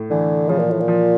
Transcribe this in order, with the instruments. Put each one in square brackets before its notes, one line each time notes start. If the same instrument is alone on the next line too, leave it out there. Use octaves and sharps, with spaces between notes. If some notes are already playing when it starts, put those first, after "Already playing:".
Already playing: [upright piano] A2
[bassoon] D3 [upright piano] E3
[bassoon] C#3 [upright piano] F3
[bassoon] A#2
A2
A#2
[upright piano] F3